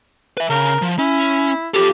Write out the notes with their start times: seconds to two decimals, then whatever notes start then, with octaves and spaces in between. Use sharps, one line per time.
0.37 B4 E5
0.50 C#3 A#4
0.82 F3
0.99 C#4 E4
1.74 F4 G4 A4